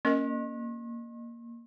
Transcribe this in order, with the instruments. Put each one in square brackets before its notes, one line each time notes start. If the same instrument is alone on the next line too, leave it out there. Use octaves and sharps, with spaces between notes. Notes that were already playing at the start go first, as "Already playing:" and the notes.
[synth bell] A#3 [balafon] C#4 A#4 D#5